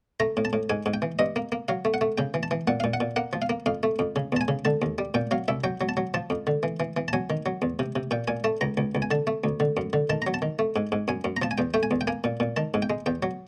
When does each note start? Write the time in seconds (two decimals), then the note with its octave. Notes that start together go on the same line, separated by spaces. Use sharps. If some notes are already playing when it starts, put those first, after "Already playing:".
0.20 A3 A#5
0.37 A2
0.45 A5
0.53 A2
0.70 G#2 G#5
0.86 G#2
0.94 G5
1.02 E3
1.19 G2 D#5
1.36 A#3
1.52 A#3
1.68 F#3 F5
1.85 A3
1.94 F#5
2.01 A3
2.18 C#3 G5
2.34 E3
2.43 A5
2.51 E3
2.68 A#2 F#5
2.80 A#2 F5
2.94 F#5
3.01 A#2
3.16 A#3 F#5
3.33 F3
3.42 F5
3.50 A#3
3.66 F2 F5
3.83 A3
3.99 F2
4.16 C#3
4.32 E2 A5
4.41 G#5
4.48 C#3
4.65 D3 A5
4.82 D#2
4.98 G3
5.14 A#2 G5
5.31 F#3 F5
5.48 C2 E5
5.64 F#3 G5
5.81 F#3
5.89 A5
5.97 F#3
6.14 F3 A5
6.30 F2
6.47 D3
6.63 E3
6.80 E3
6.97 E3
7.08 A5
7.13 F#3 G#5
7.30 D#3
7.46 F#3
7.62 E2
7.79 C3
7.96 C3
8.11 A#2 G5
8.28 A#2 G#5
8.44 A3 A5
8.61 C#2 A#5
8.77 C#2
8.95 C#2
9.02 G#5
9.11 D3 A5
9.27 A3
9.44 D2
9.60 D3
9.77 F#2
9.93 D3
10.10 D#3 A5
10.22 F#3 A#5
10.34 A5
10.42 D#3
10.59 A3
10.76 G#2
10.92 G#2
11.08 F#2 G#5
11.24 F#2
11.37 A#5
11.42 F3 A5
11.51 G#5
11.58 E2 G5
11.74 A3 G5
11.83 G#5
11.91 E2
12.01 G5
12.07 A#3 G#5
12.24 A#2
12.40 A#2
12.57 D#3 A5
12.74 G#2
12.82 G5
12.90 G#3
13.06 E2 G5
13.23 F#3